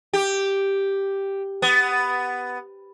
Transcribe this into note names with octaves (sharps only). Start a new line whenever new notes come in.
G4
B3